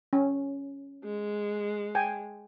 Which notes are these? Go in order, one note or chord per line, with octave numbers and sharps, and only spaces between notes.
C#4
G#3
G5 G#5